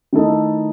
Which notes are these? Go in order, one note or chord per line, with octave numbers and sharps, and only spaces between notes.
D#3 A3 E4 A4 D#5